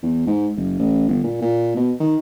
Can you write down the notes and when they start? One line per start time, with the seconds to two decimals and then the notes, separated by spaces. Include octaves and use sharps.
0.03 E2
0.27 G#2
0.57 F#1
0.79 A1
1.08 G1
1.24 A#2
1.41 A#2
1.76 B2
2.00 D#3